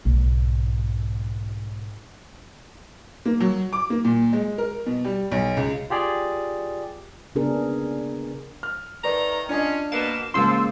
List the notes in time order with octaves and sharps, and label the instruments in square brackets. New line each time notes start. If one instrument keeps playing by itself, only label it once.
[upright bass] B1 G#2
[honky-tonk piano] A#3
F#3
D6
A#3
A#2
G#3
A#4
B2
G3
B1
C#2
[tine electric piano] F4 G4 G#4 D5
[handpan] C#3 B3 D4 G#4 A#4
[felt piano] F6
[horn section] D#3 A3 A#5 [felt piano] B4 D5
[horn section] C#4 F4 [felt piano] D4 D#5
[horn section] B2 A#3 [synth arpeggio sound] E7
[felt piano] C#3 G#3 A#3 [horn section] F3 [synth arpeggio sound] C6 E6